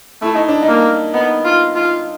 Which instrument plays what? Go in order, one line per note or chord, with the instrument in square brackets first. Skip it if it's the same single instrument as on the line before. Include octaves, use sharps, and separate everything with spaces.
[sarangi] A3 [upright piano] E4
[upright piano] D#4
D4
D#4
[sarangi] A#3
[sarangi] B3 [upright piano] D#4
[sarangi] F4
F4